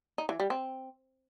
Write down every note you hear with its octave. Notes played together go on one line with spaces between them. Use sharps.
D#4
E3
G3
C4